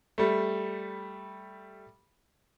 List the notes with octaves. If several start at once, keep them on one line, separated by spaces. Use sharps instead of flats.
G3 A3